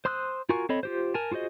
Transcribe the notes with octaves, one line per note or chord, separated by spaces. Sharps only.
C5 C6 D#6 E6 F#6
F4 F#4 A#4 G#5 C#6
C4 A4 C#5 D#5 B5
F4 G4 C5
A#4 G#5 A5
F4 F#4 G#4 C5 D#5